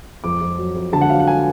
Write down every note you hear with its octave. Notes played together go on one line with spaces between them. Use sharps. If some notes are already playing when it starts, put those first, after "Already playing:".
F2 D6
F2
F#3
F2
D3 A5
F#5
F#3 F5
F#5
G#5